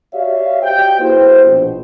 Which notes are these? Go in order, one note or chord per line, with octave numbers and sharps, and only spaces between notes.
F#4 G4 C#5 D5 E5 F5
F#4 G4 C5 D#5 G5
A#3 E4 F#4 G#4 B4 C5
A#1 B2